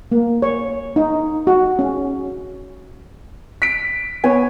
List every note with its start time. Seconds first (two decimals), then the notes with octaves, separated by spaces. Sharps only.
0.12 A#3
0.42 C#5
0.96 D#4
1.47 F#4
1.79 C#4
3.62 B6 D7
4.24 B3 C#5 G#5